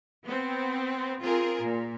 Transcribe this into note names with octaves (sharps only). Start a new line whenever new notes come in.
B3 C4
C4 F4 G#4 A#4
A#2